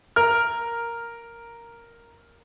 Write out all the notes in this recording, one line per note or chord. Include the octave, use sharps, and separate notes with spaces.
A#4 F6